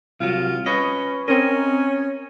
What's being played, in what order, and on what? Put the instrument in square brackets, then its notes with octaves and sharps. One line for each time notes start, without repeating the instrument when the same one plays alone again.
[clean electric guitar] C2 F#3 [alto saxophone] F4
[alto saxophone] C#4 [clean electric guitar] B4 C#5 D#5
[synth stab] C4 A#4 [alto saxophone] C#4 [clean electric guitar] D#5